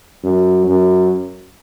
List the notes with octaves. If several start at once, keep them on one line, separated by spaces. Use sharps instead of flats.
F#2
F#2